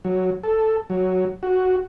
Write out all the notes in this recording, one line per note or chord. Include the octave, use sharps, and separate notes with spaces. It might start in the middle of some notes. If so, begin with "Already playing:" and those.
F#3
A4
F#3
F#4